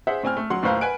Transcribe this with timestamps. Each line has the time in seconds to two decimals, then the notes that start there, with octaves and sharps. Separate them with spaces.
0.07 G#4 C5 E5 F#5
0.23 A2 C4 G#5 F6
0.37 A3
0.50 F#3 F#5 C6
0.62 D#2 A2 B4 C5 F5 A#5
0.81 B4 F#5 G#5 F#6 D7